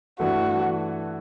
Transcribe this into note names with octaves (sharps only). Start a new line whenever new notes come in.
G2 E3 A3 F#4